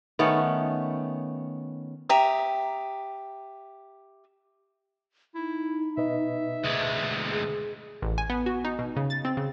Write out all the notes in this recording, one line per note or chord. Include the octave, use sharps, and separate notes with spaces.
D#3 A3 B3 C#4
G4 E5 A#5 D#6
D#4 E4
B2 B4 D#5 E5
D2 G#3
G#4
A1
G#5
B3
F#4
D#4
B2
C#3
A6
C4
C#3